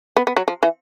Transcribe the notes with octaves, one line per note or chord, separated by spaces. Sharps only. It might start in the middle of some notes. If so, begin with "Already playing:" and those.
B3
B3
F#3
F3
E3